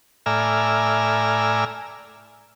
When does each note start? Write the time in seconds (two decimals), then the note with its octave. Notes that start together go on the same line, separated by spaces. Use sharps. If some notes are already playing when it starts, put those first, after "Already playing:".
0.26 A2 D5 E5 G#5 A#5 F6